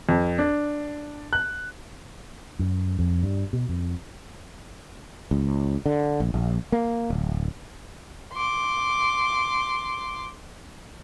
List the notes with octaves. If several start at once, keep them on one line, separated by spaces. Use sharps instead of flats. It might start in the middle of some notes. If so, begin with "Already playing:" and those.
F2
D4
F#6
F#2
F2
G2
B2
F2
C#2
D3
A#1
A#1
A#3
D1
C6 D6